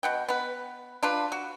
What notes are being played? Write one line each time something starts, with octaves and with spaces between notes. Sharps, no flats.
B2 F#5 G5
B3 B4
D4 F4 B4
F#4